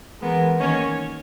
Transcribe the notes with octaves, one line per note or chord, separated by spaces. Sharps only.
E3 G#3 B3 A#4
D#3 A#3 C#4 C#5